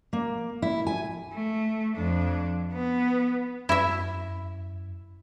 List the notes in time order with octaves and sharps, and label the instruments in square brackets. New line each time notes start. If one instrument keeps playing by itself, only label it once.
[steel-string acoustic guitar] A#3
E4
G#5
[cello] A3
F2 D4
B3
[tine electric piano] F#2 [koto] E4 E5